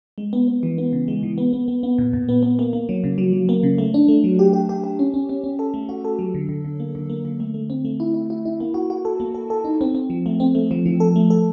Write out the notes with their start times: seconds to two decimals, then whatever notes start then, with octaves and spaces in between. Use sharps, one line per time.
0.18 G#3
0.33 B3
0.48 B3
0.63 E3
0.78 B3
0.93 C#3
1.08 G#3
1.23 E3
1.38 B3
1.53 B3
1.68 B3
1.83 B3
1.98 A#2
2.13 A#2
2.29 B3
2.43 B3
2.59 A#3
2.73 A#3
2.89 F#3
3.04 C#3
3.18 F#3
3.33 F#3
3.49 A#3
3.63 C#3
3.78 A3
3.94 D4
4.08 A3
4.24 F#3
4.39 G4
4.53 G4
4.69 G4
4.84 G4
4.99 C#4
5.14 C#4
5.29 C#4
5.44 C#4
5.59 A4
5.74 A3
5.89 F#4
6.05 A4
6.19 F#3
6.34 D3
6.49 D3
6.65 D3
6.80 A#3
6.95 D3
7.10 A#3
7.25 D3
7.40 A3
7.54 A3
7.70 C4
7.85 A3
8.00 E4
8.14 E4
8.30 E4
8.45 E4
8.60 A#3
8.74 F#4
8.90 F#4
9.05 A4
9.20 A#3
9.34 A4
9.50 A4
9.65 D#4
9.81 C4
9.95 C4
10.10 F3
10.26 A3
10.40 C4
10.55 A3
10.71 F3
10.86 F3
11.00 A4
11.16 A3
11.30 A4